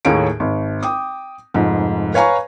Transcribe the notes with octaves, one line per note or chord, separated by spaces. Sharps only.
D#2 A2 G#4 C#5 A#5 D7
G#1
G5 D6 D#6
F1 G#2 F3
B4 C#5 F5 G#5 A#5 C#6